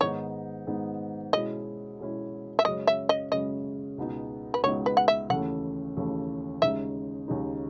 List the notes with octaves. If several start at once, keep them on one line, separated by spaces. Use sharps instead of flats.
G#2 D#3 G#3 B3 D#4 C#5
G#2 D#3 G#3 B3 D#4
B2 G#3 C#4 E4 D#5
B2 G#3 C#4 E4
E5
F#2 C#3 G#3 C#4 D#5
E5
D#5
F#2 C#3 G#3 C#4 D#5
C#2 B2 G#3 B3 D#4
B4
C#2 B2 G#3 B3 D#4 C#5
B4
F#5
E5
D#2 C#3 E3 A3 F#5
D#2 C#3 E3 A3
D#2 C#3 G#3 D#4 E5
D#2 C#3 G#3 D#4